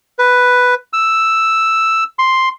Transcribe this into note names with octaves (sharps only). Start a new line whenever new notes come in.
B4
E6
C6